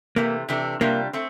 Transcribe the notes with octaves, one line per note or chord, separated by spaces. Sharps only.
C3 E3 A3 A#3
C3 E3 A3 D4
C3 G3 A#3 D4 F4
A3 C4